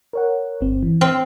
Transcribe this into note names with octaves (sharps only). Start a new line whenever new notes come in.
A#4 C#5 F#5
G1 C4
E3
C4 F6